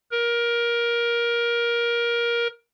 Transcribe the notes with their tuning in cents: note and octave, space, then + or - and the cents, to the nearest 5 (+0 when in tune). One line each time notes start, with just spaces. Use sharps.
A#4 +20